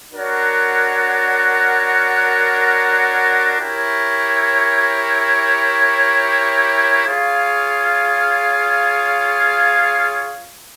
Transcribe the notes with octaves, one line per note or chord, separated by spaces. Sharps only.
D4 F#4 A#4 C#5 F#5
E4 G4 A#4 C#5
F4 G#4 C#5 F5